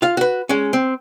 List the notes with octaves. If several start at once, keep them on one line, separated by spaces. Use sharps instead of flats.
F4 F5
F#4 B4
G#3 C#4
C4